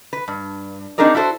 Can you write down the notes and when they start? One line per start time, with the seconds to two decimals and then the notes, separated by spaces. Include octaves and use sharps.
0.13 B4
0.28 G2
0.98 C4 D4 D#4 G#4 A#4 D5
1.15 E4 F#4 A4 C5